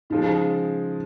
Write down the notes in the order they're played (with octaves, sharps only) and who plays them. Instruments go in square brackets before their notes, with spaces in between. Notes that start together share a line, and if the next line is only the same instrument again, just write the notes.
[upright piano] C#3 F3 G#3 [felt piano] D#4